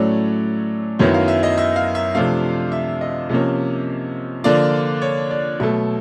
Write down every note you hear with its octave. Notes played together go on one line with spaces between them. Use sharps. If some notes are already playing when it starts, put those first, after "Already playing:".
Already playing: A2 F#3 A3 C#4 D5
F#2 D#3 F#3 B3 E4 C#5
F5
E5
D#5
E5
F5
E5
C3 F3 A3 D4 F4 F5
E5
D#5
C3 F3 A#3 C#4
D3 F3 A#3 D4 F4 D5
C#5
D5
B2 F#3 A3 E5